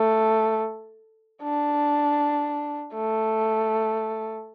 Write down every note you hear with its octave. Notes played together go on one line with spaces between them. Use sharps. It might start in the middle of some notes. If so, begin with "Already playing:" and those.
Already playing: A3
D4
A3